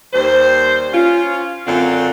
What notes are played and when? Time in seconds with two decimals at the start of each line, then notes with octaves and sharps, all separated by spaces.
0.13 D#2 G3 C5
0.93 C#4 F4
1.66 F#2 D3 A3 C4 F4